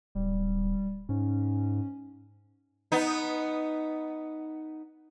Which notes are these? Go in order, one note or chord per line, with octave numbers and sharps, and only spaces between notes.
D1 G3
G#2 C#4
B3 D#4